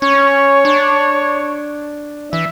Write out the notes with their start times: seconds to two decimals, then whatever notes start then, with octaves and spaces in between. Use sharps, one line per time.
0.02 C#4 C#5
0.65 D4
2.33 E3 E5